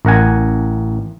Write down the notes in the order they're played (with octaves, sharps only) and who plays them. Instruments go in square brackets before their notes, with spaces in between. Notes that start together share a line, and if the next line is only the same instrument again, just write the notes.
[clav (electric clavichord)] A1 A#4 F#5 G#5